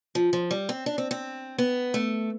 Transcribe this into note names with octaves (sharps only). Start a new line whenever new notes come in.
F3
F3
G3
C4
D4
C4
C4
B3
A3